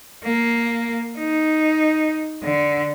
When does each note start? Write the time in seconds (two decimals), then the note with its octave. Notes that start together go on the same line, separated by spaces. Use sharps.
0.24 A#3
1.18 D#4
2.43 D3